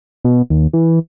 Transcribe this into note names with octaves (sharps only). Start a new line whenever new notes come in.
B2
D#2
E3